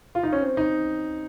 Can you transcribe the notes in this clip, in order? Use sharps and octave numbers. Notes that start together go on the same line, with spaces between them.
F4
D#4
C#4
C4
D#4